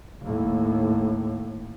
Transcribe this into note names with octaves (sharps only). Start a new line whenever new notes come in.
D#2 A2